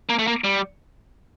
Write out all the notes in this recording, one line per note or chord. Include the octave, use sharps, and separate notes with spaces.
A#3
A3
A#3
G3